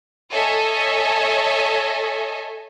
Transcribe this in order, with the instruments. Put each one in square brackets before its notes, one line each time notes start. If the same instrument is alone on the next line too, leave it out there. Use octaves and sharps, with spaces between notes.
[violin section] A4 C#5 D#5 E5 G#5